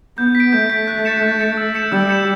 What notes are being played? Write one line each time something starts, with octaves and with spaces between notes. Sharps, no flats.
B3 G6
B6
D7
A3 G6
B6 D7
F#6
A6 C#7 E7
F#6
A6 C#7 E7
E6
G6 C#7 E7
G3 E6
G6 C#7 E7